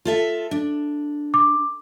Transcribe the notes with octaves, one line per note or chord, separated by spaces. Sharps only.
F4 A4 E5
D4
D6